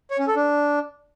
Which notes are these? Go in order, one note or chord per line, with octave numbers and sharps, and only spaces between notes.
C#5
C#4
A4
D4